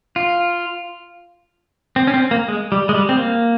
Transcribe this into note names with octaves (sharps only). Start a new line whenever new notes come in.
F4
C4
C#4
C4
A#3
G#3
G3
G#3
G3
C4
A#3